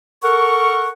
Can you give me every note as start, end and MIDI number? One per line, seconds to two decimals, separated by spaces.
0.23 0.89 69
0.23 0.89 70
0.23 0.89 78
0.23 0.89 85